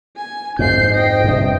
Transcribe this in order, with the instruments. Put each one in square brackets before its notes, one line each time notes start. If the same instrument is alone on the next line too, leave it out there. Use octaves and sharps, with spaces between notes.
[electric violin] G#5
[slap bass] F2 G#2 [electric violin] G6 C7
[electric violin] D#5 G5
[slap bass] G2 C3